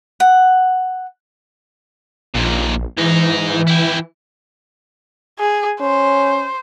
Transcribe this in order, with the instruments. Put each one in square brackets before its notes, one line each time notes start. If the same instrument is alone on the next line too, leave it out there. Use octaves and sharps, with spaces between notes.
[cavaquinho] F#5
[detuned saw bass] A#1 [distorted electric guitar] D#2 A#2
[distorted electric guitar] G#2 D#4 [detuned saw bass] E3
[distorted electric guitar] E4 G4
[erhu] G#4
[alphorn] C#4 [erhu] C5